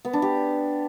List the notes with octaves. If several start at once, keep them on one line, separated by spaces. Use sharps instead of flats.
B3
D4
G4